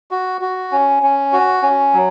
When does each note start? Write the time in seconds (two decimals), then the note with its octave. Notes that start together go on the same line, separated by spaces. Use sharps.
0.11 F#4
0.41 F#4
0.72 C#4
1.03 C#4
1.33 F#4
1.62 C#4
1.93 F#3